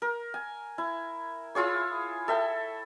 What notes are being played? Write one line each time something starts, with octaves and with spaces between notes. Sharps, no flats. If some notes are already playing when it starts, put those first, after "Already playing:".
A#4
G#5
E4
E4 F4 G#4 C#5
A4 E5 G5 A5